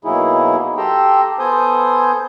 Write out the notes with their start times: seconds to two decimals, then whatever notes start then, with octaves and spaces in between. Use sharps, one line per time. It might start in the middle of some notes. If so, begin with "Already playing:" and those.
0.05 B2 F#3 A#3 D#4 E4 G#4
0.77 G4 A4 G5 A#5 C6 E6
1.39 B3 A4 C5 G#5 D#6 G6